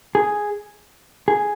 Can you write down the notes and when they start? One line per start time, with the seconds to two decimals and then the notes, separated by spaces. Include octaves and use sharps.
0.15 G#4
1.28 G#4